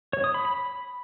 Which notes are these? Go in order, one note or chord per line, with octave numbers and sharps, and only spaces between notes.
C#5
D#6
B5
B5